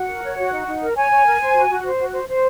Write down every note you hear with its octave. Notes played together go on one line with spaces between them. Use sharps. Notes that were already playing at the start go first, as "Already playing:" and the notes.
Already playing: F#4 F#5
A#4
C#5
F#4
D#4
D#4
A#4
C#5 G#5
C#5
A#4
C5
F#4
F#4
C5
F#4
C5
C5